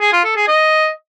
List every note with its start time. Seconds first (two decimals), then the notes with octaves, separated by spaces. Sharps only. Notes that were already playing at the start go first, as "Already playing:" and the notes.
0.01 G#4
0.13 F4
0.24 A4
0.36 G#4
0.48 D#5